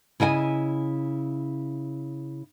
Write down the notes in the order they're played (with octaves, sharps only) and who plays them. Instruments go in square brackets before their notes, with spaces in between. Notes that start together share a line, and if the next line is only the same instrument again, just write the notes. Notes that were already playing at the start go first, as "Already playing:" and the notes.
[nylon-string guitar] C#3 E4 D#5 G5 G#5